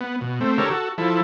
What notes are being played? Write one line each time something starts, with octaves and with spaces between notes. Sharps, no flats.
B3
B2
A3 C4
D3 G4 A4 A#4 C#5
F#4 A4
F3 E4 A4